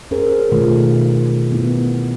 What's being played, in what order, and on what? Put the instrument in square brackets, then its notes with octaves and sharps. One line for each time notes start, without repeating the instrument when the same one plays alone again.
[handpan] C#4 G#4 A#4 C5
B2 D#3 A3 F4
B3 E4